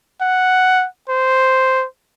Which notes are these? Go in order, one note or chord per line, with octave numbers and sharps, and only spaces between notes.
F#5
C5